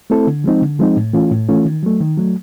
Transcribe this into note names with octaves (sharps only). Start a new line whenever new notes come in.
A3 C4 E4 A4
D3
F3 G#3 C4 D#4
D3
F3 G#3 C4 D#4
A2
E3 A3 C#4 F4
A2
E3 A3 C#4 F4
D#3
F#3 A3
D#3
F#3 A3